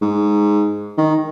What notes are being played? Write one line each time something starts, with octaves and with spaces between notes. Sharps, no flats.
G#2
D#3